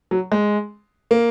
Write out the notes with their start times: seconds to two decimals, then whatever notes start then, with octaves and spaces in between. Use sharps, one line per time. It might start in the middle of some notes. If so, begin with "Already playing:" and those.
0.11 F#3
0.32 G#3
1.11 A#3